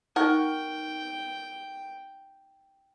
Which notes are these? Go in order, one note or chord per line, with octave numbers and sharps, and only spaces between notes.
D#4 A#4 F#5 G5 C#6